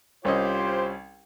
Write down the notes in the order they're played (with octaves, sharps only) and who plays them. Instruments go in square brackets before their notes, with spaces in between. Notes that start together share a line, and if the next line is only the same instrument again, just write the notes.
[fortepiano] C2 C#4 D#5 [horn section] F4 G4 C5